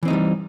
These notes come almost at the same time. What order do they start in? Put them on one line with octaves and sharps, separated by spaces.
E3 C4 D#4 A3 G3